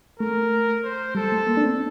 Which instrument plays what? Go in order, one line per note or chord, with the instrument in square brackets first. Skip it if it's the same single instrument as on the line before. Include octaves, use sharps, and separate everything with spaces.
[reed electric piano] A3 [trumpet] A#4
[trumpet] C5
[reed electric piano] G3 [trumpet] A4
[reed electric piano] A3
A#3
D4
C4